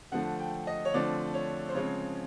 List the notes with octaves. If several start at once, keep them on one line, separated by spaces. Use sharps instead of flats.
D3 F3 A3 F#5
G5
D#5
C#5
D3 F3 A3 C4 D5
C#5
C5
C#3 F3 G#3 C4 C#5